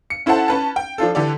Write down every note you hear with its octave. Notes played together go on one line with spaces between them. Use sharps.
C#7
C#4 E4 A4 C5 F#5 A5
C#4 B4 A5
G5
F3 D4 F4 A4
D3 E3 G4 A4 D5